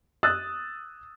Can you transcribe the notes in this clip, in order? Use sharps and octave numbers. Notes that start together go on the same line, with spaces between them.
D#6 E6 F#6 A6